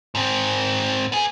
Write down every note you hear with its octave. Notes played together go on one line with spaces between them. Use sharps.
G#2 C4
B3 G#4